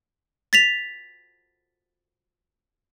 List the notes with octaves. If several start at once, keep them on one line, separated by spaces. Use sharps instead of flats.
A6 B6 F7